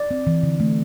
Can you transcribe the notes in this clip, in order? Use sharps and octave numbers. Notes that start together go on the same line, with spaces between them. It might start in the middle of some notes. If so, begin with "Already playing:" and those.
Already playing: D5
C4
E3
D3
A3